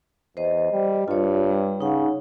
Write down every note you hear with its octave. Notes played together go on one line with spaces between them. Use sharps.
E2 C5 D#5
G3
G2 F4 C#5
G3
C#3 D#4 F#5